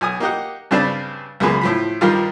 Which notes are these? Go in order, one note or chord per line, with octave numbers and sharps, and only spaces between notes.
B1 G#5 D#6
A#3 D#4 G4 D#5 F#5
G2 C#3 C4 D4 B4 A5
C#2 F#2 A#3 B3 G#4 B4
A2 F3 B5
G2 D#3 F3 G3 F4